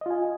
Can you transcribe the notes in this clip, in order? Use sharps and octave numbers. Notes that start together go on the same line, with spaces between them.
F4 D#5 G#5